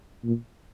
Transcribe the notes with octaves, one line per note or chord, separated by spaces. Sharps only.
A#2